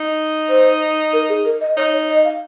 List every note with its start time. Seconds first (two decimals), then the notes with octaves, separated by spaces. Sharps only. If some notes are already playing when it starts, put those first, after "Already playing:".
Already playing: D#4
0.49 C5
1.13 A#4
1.29 G#4
1.45 A#4
1.61 D#5
1.77 D#4 C#5
1.93 C#5
2.09 D#5
2.25 F5